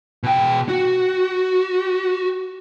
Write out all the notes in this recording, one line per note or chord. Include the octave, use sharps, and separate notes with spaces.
B2 G5
F#4